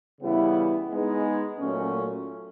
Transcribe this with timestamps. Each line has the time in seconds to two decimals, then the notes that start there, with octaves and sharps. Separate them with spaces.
0.21 C#3 E3 G3 B3 E4
0.90 G#3 B3 D#4 G#4
1.58 A#2 F#3 A3 C#4